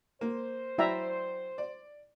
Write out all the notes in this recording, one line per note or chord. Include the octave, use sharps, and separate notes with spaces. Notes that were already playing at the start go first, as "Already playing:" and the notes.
A#3 C5
F#3 E4 D5 E5 G5 A#5
D5